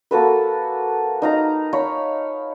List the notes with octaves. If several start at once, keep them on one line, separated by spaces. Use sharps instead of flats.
A#3 F#4 A4 B4
D#4 F5 A#5
C#5 F5 B5